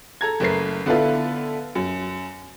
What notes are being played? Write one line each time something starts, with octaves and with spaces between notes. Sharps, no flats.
A4 A#5 G#6
F#1 A3 A#4 B4 C7
D3 B3 E4 F4 A4 B4
F#2